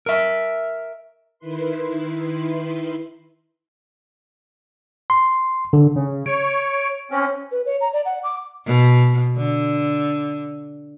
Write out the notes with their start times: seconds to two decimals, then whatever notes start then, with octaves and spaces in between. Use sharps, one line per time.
0.06 A#4 E5
1.39 D#3 E4 B4 C6
5.10 C6
5.73 D3
5.96 C#3
6.26 C#5 D7
7.11 C4 C#4
7.52 B4
7.66 C#5
7.81 A#5
7.93 D5
8.05 F#5
8.24 D6
8.66 B2
9.37 D3